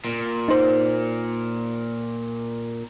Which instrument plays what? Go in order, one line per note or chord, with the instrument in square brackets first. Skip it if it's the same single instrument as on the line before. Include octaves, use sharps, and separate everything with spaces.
[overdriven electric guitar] A#2
[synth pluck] D#4 C5